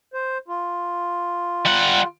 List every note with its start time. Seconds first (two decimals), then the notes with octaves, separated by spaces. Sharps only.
0.14 C5
0.48 F4
1.65 G3 F#5